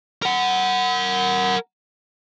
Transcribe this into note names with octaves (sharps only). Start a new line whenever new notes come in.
A#4 F#5